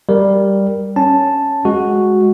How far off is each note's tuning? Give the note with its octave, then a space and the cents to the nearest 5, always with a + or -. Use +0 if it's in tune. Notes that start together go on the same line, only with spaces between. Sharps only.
G3 +0 A#4 +0
C#4 +0 A5 +0
G#3 +0 F#4 +0